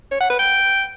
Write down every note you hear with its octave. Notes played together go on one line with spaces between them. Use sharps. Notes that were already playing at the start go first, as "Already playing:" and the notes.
C#5
F#5
B4
G5